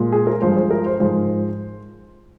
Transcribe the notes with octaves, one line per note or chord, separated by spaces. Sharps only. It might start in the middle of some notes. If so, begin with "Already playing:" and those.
Already playing: A#2 G#3
G#4
A#4
G2 F3 G#3 C5
C5
A#4
C5
G#2 F3 G#3 C5